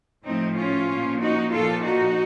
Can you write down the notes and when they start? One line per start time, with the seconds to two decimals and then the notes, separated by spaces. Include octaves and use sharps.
0.25 A2 F3 C4 D#4
0.57 C#4 F4
0.89 A#2 F3
1.21 D#4 F#4
1.53 A#2 F3 F4 A4
1.85 D#4 F#4